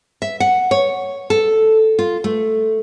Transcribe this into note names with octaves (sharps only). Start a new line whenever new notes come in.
E5
F#5
C#5
A4
F4
A3